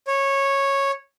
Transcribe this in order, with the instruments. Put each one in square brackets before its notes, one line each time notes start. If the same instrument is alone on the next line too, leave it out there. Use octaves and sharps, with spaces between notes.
[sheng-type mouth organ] C#5